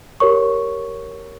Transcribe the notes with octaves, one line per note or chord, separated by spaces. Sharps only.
G4 A#4 C#5 C#6